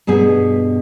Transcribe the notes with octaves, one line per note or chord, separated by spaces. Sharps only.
G2 B2 B3 G#4